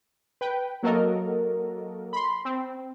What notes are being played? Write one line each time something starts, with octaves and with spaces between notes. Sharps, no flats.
B4 G5
F#3 A#3 F#4 A4 A#4 D#5
B5 C6
C4